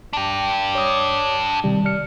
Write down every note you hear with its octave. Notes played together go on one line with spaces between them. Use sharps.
D4 G4
C#5 D#6
C3 D#3 G3
D5 F6 C#7